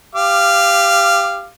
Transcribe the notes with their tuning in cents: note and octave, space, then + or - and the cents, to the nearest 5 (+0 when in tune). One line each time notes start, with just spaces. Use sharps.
G4 +5 F5 -15 D6 +20